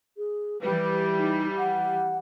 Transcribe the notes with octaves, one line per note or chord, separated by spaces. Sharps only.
G#4
E3 G3 B4
D#4
F#5